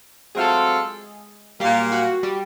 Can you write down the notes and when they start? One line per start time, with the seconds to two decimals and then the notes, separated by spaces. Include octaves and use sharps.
0.35 F#3 G#3 A3 C4 F4 G#4 A4
1.60 A#2 F#3 G3 A#3 G4
1.92 F#4
2.23 G3 G4